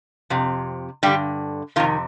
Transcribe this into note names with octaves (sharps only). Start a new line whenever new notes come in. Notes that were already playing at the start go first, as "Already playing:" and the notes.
F2 C3
G2 D3 G3 G4
F2 C3 D#3 F4